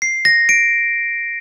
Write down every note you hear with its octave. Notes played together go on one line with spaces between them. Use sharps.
C7
A#6
D7